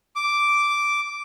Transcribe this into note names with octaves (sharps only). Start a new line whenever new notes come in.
D6